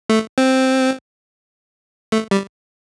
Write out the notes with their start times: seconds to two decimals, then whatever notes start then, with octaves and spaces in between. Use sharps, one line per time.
0.10 A3
0.38 C4
2.12 A3
2.31 G3